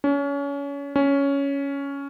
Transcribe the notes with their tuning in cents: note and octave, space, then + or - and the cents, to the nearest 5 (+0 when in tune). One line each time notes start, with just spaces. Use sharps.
C#4 +30
C#4 +10